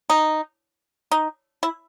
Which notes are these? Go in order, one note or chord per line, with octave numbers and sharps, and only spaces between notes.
D#4
D#4
E4